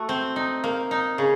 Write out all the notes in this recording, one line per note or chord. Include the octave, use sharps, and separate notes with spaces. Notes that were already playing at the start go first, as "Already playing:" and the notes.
Already playing: A3 F#4
C4
D#4
A#3
D#4
C#3